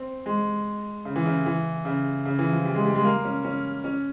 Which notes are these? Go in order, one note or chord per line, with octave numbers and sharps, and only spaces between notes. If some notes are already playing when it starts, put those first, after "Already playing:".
Already playing: C4
G#3
C#3
E3
C#3
E3
C#3
C#3
E3
F3
G3
G#3
G3
G#3
A#3
C#4
C#4
C#4